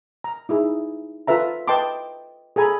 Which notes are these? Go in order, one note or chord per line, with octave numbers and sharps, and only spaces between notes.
A#5
D#4 E4 G#4
F4 A4 B4 E5 A#5
B4 D#5 G5 A5 C6 D6
G#4 A4 G#5 A#5 B5